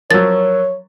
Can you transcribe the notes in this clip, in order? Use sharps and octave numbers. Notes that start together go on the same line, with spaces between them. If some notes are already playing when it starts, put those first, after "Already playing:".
F3 F#3 A#4 C#5 E6 A6